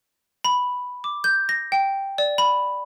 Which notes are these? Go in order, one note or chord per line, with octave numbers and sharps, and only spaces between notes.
B5
D6
G6
A#6
G5
D5
B5